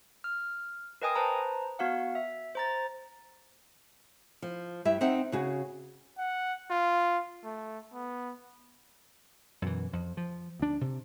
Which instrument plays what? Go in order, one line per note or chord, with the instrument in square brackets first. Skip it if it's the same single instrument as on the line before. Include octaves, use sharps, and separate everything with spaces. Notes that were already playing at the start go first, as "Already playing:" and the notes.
[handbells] F6
A#4 B4 D#5 G5 G#5 D#6
B4 C5 A5 A#5
B3 F#4 F5 F#5
E5
C5 A#5 A6
[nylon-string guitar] F3
G2 E4 G4 E5
C4 D#4 E5 F#5
C#3 F#4 G#4
[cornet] F#5
F4
A3
B3
[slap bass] F#2 B2 E3
F2
F3
D2 D4
C3